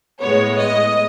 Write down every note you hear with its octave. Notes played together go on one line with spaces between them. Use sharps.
A2 G#3 B3 C#5
D#5